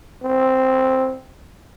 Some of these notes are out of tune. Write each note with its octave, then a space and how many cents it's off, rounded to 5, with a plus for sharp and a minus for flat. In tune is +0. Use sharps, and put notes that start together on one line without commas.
C4 +0